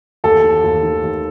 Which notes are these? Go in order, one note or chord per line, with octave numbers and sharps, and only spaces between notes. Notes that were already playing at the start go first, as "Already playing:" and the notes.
D#2 A4
D#3
D#2
D#3
D#2